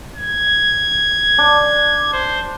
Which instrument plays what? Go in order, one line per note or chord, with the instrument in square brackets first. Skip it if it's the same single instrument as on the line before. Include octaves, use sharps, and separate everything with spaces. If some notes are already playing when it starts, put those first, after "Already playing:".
[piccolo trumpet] G#6
[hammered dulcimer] D4
[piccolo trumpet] C5